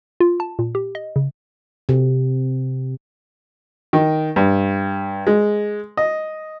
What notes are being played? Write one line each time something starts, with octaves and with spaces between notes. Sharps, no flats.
F4
A5
A#2
G4
D#5
C#3
C3
D#3
G2
G#3
D#5